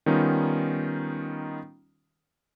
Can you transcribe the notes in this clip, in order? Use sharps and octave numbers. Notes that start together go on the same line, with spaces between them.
D#3 G3 B3 C#4 D#4 F4